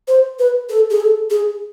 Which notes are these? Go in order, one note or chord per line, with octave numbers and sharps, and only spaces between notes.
C5
B4
A4
G#4
A4
G#4